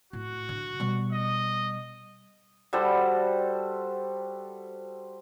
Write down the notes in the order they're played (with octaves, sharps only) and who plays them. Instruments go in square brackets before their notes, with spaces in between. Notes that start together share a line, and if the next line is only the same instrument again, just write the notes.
[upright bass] A2 [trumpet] F#4
[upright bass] D3
B2 G3
[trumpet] D#5
[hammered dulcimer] G3 F#4 A4 C5